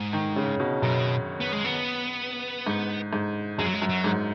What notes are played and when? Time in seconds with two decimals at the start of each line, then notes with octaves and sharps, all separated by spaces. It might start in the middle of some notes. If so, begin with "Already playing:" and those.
Already playing: G#2
0.13 D#3
0.36 C#3
0.60 B2
0.82 F#2 B2
1.40 B3
1.53 G#3
1.65 B3
2.67 G#2
3.13 G#2
3.58 F#2 G#3
3.66 F#3
3.73 G#3
3.82 F#2
3.89 F#3
4.04 G#2